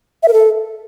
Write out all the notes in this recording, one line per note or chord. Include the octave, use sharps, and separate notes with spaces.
E5
A#4
A4